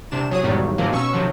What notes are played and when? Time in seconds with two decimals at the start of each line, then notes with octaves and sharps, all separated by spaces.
0.11 C2 C3 D4 E7
0.30 C2 F#3 G#4 D#6
0.43 B1 E2 G#2 D#3 F#3 G3
0.78 G#2 C3 D#3 F3 F#3 A#3
0.91 B2 C#4 C#6 E6
1.13 C3 D#3 F3 F#3